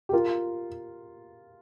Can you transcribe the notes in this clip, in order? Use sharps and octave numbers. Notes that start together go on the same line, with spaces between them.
G4
F4 A#4